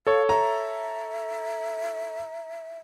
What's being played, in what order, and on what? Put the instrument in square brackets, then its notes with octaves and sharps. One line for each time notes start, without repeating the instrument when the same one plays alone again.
[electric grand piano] A4 C#5 [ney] F5
[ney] E5 [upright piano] A#5